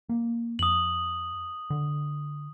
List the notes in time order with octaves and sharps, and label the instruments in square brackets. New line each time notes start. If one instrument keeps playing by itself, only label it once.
[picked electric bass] A#3
[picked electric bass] F2 [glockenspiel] D#6 F#7
[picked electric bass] D3